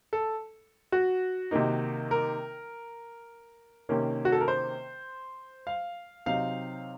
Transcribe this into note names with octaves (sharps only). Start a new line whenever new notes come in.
A4
F#4
C3 D#3 A#3 D#4
A#4
C3 D#3 A#3 C#4
F#4
A4
A#4
C5
F5
C3 F#3 C4 D#4 F5